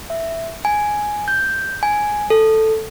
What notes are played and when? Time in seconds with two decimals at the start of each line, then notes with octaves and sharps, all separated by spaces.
0.10 E5
0.65 G#5
1.28 G6
1.83 G#5
2.30 A4